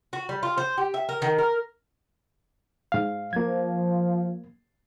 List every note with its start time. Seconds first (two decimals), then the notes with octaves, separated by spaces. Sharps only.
0.13 F#4
0.29 G3
0.43 F4
0.58 C5
0.78 G4
0.94 E5
1.09 A#4
1.22 D#3
1.38 A#4
2.92 G#2 F5
3.33 F3 A#3 G#6